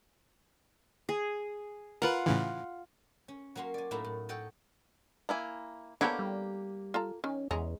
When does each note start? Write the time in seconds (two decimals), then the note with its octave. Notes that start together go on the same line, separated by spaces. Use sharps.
1.09 G#4
2.02 F4 A#4 B4 F#5
2.26 A2 C#3 E3
3.28 C#4
3.55 F#3 A#3 C#4 F#4 C6
3.74 D5 G#5
3.91 A2 F#3 A3 A#3 D#4 E4
4.04 A2
4.29 A4 C#5 D#5 F#5 G5
5.29 A#3 E4 G#5
6.01 D3 A#3 B3 E4 G4 A4 A#4 C#5
6.19 G3
6.94 F4 A4 A#5
7.24 D#3 C#4
7.51 E2 G#3 C#4 A#5